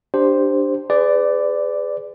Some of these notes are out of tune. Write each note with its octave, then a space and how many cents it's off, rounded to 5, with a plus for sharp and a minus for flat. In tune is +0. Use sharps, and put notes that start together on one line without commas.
D4 +0 G4 +0 C5 +0
G#4 +0 B4 +40 D5 +0